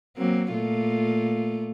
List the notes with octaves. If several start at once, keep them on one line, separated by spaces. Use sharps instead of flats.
F#3 A#3 C4
A#2 A3 F4